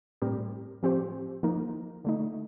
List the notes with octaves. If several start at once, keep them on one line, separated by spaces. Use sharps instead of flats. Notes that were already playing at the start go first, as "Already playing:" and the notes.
A2 G3 C4 G4 A#4
A2 F3 C4 G4 C5
F3 A#3 D#4 A#4
D3 A3 D#4